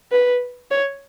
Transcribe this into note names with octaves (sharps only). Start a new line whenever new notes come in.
B4
C#5